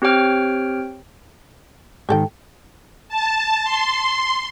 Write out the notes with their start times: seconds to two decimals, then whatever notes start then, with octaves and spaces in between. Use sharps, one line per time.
0.02 C4 G4 C#5 G5 F6
2.09 G#2 D#3 G4 A4 G5
3.09 A5
3.64 C6